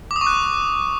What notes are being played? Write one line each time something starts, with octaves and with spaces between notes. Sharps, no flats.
D6
D#6
C#6
F#6